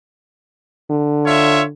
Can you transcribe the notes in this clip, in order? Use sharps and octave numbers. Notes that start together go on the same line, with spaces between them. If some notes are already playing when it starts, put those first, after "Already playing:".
D3
F4 C#5 E5